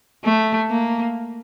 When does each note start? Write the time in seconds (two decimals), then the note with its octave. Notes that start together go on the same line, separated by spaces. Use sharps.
0.25 A3
0.70 A#3